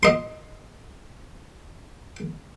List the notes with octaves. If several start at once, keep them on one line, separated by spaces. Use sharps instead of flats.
D#5 C6